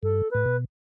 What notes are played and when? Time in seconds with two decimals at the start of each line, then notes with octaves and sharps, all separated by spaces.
0.03 G2 A4
0.31 A2 B4
0.46 B2